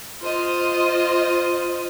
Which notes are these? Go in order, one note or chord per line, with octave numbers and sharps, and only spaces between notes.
F4 C5 D#5